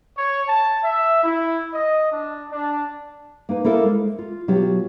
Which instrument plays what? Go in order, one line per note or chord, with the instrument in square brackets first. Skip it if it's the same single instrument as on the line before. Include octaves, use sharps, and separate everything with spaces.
[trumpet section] C#5
A5
E5
E4
D#5
D4
D4
[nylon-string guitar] A#3 D#4 B4
A#3 E4 A4 A#4 C5
G#3
F4
B2 F#3 F4 G4